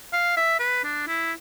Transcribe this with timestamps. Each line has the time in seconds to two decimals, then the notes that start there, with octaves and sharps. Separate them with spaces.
0.13 F5
0.37 E5
0.60 B4
0.84 D4
1.08 E4